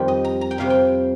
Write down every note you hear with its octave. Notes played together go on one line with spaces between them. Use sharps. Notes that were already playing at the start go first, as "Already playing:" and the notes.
Already playing: F2 D#3 G3 G5
D#5
A#5
A#5
G5
F2 C3 G3 F5
G5